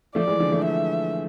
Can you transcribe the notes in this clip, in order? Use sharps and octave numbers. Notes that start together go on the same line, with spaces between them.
F3 A3 D5
E3 G#3
D3 F3
F3 A3
E5